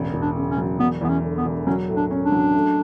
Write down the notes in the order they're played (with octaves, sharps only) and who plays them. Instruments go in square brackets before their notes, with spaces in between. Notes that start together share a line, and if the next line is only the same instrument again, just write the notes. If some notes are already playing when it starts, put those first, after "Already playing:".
Already playing: [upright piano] E1 A1
E1
[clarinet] D4
[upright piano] C#3
[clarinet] C#4
[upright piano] F#3
[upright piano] E1 [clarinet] B3
[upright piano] E2 [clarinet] B3
[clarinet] C#4
[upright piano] D3
[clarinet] B3
[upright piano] E1
[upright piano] F#3 [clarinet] C#4
[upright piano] A2
[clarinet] D4
[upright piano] C#4
[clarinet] D4
[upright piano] F#3
A3